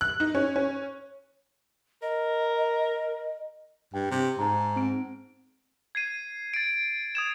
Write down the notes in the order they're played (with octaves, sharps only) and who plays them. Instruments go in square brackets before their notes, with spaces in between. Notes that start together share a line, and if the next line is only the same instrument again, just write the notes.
[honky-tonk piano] F#6
D#4
C#4
C#4
[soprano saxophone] A#4 [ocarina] D#5
[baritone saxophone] G2 [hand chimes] G5
[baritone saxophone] C3
[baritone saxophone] G#2 [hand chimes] A5 A#5
[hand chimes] C4 D7
[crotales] G#6 C7 D#7
A6 D7
D#6 G#6 E7